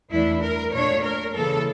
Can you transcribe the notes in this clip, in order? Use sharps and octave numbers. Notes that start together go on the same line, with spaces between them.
E2 E3 A3 D4 E4
A#4
A#2 A3 D4 C#5
A#4
C#3 E3 A#3 A4